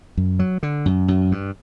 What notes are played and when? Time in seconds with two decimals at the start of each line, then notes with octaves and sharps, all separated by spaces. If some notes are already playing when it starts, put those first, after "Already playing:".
0.17 F#2
0.39 F#3
0.63 D3
0.86 F#2
1.08 F#2
1.32 G2